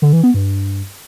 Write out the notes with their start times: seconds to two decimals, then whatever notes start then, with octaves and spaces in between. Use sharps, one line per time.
0.02 D3
0.13 E3
0.24 B3
0.34 G2